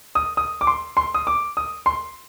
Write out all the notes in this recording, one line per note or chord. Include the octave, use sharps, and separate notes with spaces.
D#6
D#6
D6
C6
C6
D#6
D6
D#6
C6